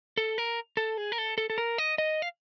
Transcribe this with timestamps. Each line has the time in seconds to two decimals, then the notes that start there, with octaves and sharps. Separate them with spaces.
0.17 A4
0.38 A#4
0.77 A4
0.98 G#4
1.12 A#4
1.18 A4
1.38 A4
1.50 A4
1.58 A#4
1.78 D#5
1.98 D#5
2.22 F5